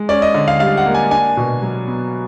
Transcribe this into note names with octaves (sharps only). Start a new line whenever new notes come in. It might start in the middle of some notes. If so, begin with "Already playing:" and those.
Already playing: G#3
C#4 D5
D#5
D3
F5
G3 F5
F#5
A#3
G#5
D4 G#5
B2
F#3
B3